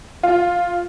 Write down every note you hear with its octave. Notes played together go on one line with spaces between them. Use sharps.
F4